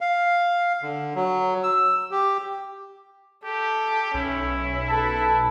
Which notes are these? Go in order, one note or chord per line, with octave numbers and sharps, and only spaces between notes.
F5
D3
F#3
E6
G4
G4 A4
B1 C#4 E4
A4 B4 A5